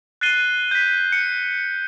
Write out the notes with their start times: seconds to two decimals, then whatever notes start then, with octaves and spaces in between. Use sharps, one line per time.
0.21 F#6 A6 C7 D#7 G7
0.71 G6 B6
1.12 C#7